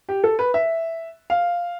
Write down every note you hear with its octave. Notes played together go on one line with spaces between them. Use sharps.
G4
A4
B4
E5
F5